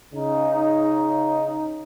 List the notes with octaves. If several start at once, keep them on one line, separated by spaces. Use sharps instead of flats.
C#3 D#4